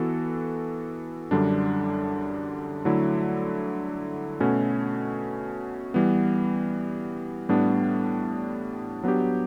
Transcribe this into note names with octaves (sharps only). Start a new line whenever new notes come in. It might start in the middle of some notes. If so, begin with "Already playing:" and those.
Already playing: E3 B3 F#4 A4
F#2 D3 G3 D4
D3 F#3 A3 E4
B2 A3 C#4 F#4 A4
E3 G3 B3
A2 G3 B3 D4
F#3 B3 D4 G4